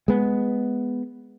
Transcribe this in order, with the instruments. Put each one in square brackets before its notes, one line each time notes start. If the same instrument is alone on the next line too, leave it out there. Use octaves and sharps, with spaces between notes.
[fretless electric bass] G#3 B3